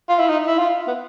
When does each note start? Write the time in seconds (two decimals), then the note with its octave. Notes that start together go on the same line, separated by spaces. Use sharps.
0.09 F4
0.19 E4
0.29 D#4
0.47 E4
0.58 F4
0.88 B3